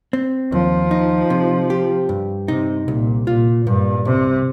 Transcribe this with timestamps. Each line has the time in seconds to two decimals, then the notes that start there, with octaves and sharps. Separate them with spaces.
0.13 C4
0.52 D#2 F3
0.91 D#4
1.30 C3
1.70 G4
2.09 G2
2.48 C3 D#4
2.88 C2 A#2
3.26 A#2 F4
3.66 G2 A#2
4.05 C2 C3